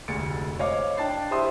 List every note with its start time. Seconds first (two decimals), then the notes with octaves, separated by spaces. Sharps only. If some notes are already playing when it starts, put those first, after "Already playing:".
0.08 F1 D2 G#3 A6 C#7 D7
0.59 C5 C#5 D#5 F5 D6
0.97 D4 G5 A5 A6 C7
1.31 E4 G4 C5 E5 C6 D#6